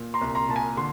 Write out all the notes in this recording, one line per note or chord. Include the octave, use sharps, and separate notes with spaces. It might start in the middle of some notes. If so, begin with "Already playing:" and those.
Already playing: A#2
A#5 C6
C2
A#5 C6
A#2 A5
G#5 A#5
D3 C6